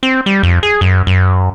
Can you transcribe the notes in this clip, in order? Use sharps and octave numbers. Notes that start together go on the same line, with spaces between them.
C4
G3
F2
G#4
F#2
F#2